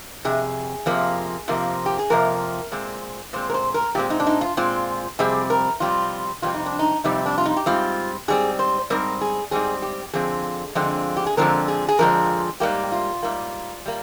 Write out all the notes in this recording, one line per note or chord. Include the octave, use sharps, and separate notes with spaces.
F2 C3 G#4
F2 C3 F3 A#3
F2 C3 F3 A#3
G4
G#4
F2 C3 F3 A#3 A#4
A#2 G#3 C4
A#2 G#3 C4 C5
A#4
C5
A#4
A#2 G#3 C4 G4
D#4
D4
D#4
F4
A#2 G#3 C4 F4
F2 C3 G3 C4 G#4
A#4
F2 C3 G3 C4 F4
F2 C3 G3 C4 F4
D#4
D4
D#4
F2 C3 G3 C4 D#4
D4
F4
D#4
G4
G#2 G3 C4 F4
G#2 G3 C4 G#4
C5
G#2 G3 C4 A#4
G#4
G#2 G3 C4 G#4
G4
F2 D3 F3 C4 G#4
F2 D3 F3 G#3 C4
G4
G#4
F2 D3 F3 G#3 C4 A#4
G#4
G#4
F2 D3 F3 G#3 C4 A#4
G#2 G3 A#3 G4
F4
G#2 G3 A#3
G3 A#3